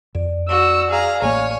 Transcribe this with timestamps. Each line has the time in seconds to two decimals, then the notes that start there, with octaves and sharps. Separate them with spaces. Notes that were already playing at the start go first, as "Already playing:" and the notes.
0.15 F2 D5
0.49 F#4 D5 E6
0.91 G#4 F5 A#5
1.22 A1 A#3 C#5 G#5